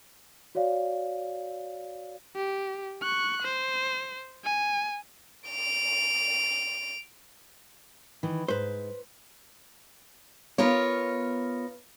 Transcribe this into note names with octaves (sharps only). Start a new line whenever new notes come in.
F#4 C#5 D5 F5
G4
C#6 F#6
C5
G#5
D7 F7
D#3 E3
G#2 B4 C5
B3 F4 A#4 C#5